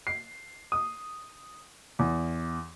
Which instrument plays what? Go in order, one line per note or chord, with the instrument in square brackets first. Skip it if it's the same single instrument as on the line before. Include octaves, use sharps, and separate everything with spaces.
[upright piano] C7
D#6
E2